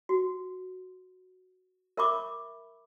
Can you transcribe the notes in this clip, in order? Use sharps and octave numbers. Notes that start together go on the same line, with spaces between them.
F#4
A#4 E5 B5 C#6 D6